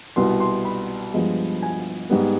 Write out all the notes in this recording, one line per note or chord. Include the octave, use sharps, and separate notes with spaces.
C2 B2 B3 C6
C6
B5
G2 F3 G#3 B3
G#5
G#2 G3 B3